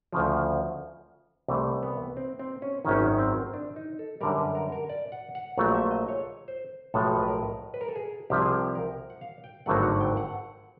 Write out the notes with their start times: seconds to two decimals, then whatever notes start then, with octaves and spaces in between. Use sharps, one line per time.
0.13 D2 C#3 F3
1.48 C2 C3 E3 A3
1.83 B3
2.17 C4
2.39 C4
2.62 C#4
2.85 G#1 F#2 D#3 C#4
3.19 C4
3.54 D4
3.76 D#4
3.99 A4
4.21 F#2 D3 G3 A#4
4.38 B4
4.55 A#4
4.72 A#4
4.89 D5
5.12 F#5
5.35 F#5
5.58 A#1 A#2 F#3 A3 F#5
5.75 E5
5.91 D#5
6.09 C#5
6.48 C5
6.94 B1 A2 F3 G#3 A4
7.23 B4
7.28 A#4
7.74 B4
7.81 A#4
7.88 A4
7.96 G#4
8.30 C2 C3 F3 G4
8.42 G#4
8.52 G4
8.75 A#4
9.10 F#5
9.21 F5
9.44 G5
9.66 G#1 G2 D3 F#3 A3 F#5
9.83 F#5
10.01 G5
10.17 F#5